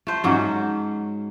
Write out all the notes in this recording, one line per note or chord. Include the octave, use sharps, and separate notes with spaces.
A3 C5
G#2 F#3 C#4